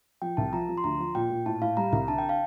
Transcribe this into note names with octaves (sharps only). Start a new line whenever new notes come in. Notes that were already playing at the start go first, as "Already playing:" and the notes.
F3 G5
C2 A5
F3 A#5
F3
C6
D2 A#5
F3
A#2 G5
A#2
A2 A5
A2 F5
G3 A#5
C2 A#5
D3 A5
G5
F5